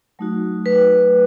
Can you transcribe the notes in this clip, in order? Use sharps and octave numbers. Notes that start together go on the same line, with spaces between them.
F#3 A3 D#4 F#4
B4